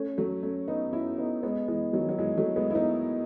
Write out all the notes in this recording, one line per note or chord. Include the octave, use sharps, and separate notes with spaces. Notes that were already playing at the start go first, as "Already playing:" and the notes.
Already playing: A3 C#4
F#3 A3
A3 C#4
B3 D#4
C#4 E4
B3 D#4
G#3 B3
E3 G#3
D#3 F#3
F#3
E3 G#3
F#3 A3
G#3 B3
E4
B3 D#4